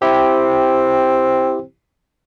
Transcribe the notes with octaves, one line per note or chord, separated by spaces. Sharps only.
C4 E4 G4